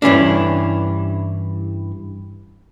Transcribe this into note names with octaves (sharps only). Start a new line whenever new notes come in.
G2 E3 C#4 D4